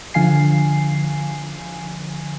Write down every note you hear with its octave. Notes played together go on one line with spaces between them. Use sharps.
D3 F3 F5 G#5 C7